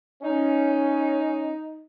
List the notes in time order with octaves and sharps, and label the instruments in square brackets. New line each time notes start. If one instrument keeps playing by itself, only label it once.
[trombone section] C#4 [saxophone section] D#4